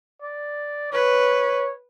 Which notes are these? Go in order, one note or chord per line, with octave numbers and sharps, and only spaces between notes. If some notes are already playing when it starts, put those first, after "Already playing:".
D5
B4 C#5